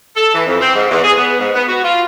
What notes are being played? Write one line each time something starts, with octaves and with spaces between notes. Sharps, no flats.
A4
E3
F2
C4
G#2
E2
G#4
B3
G#2
B3
F#4
F4